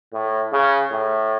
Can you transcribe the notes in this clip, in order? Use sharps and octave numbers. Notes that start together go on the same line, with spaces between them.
A2
C#3
A2